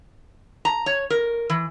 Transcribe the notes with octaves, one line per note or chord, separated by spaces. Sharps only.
A#5
C#5
A#4
E3